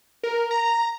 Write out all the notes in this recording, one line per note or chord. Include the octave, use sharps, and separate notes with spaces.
A#4
A#5